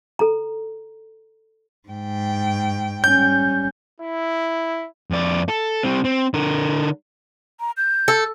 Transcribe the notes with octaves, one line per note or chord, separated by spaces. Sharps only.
A4 A#5
G#2 G5
G3 C#4 G6
E4
F2 D5
A4
G3 C4
C4
D3 A#4
A#5
G6
A4